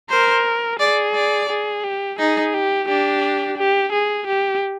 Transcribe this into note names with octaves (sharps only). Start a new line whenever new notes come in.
A#4 C5
G#4 D5
D5
G#4
G4
D#4 G#4
G4
D4 G4
G4
G#4
G4